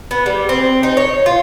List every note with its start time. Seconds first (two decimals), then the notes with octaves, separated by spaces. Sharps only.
0.11 B3
0.26 G3
0.49 C4
0.83 D#4
0.97 C#5
1.26 F4